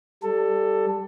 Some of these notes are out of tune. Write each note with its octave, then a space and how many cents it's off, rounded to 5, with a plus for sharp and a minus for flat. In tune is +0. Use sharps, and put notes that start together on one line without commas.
G3 +0 A4 +10